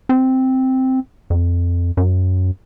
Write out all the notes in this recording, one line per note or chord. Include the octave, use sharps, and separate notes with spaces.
C4
F2
F#2